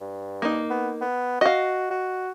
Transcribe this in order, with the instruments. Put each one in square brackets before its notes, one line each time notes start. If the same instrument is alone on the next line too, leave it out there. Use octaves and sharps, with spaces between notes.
[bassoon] G2
[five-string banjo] A#3 D#4
[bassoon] B3
B3
[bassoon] F#4 [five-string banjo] D#5 F5
[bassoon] F#4